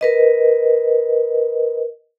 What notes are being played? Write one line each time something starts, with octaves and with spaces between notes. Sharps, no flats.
A#4 B4 D#5